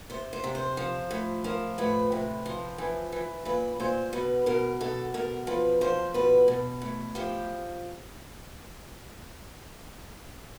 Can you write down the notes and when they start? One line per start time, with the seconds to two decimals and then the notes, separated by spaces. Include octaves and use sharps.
0.10 C3 C5
0.33 C5
0.44 C3
0.55 C5
0.77 F3
1.11 A2
1.44 F3 A#4
1.78 A2 B4
2.12 C3
2.46 F3
2.78 E3
3.12 E3
3.45 A#2 B4
3.80 A#2 C5
4.13 B2 B4
4.46 B2 A#4
4.81 B2 A4
5.14 B2 A#4
5.47 F3 B4
5.81 F3 C5
6.14 B2 B4
6.48 B2
6.82 A2
7.15 F3 G4